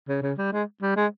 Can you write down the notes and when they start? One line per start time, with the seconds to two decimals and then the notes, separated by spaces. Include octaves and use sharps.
0.09 C#3
0.22 C#3
0.38 G3
0.53 G#3
0.82 G3
0.96 G#3